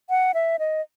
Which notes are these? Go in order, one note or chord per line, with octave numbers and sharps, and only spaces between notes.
F#5
E5
D#5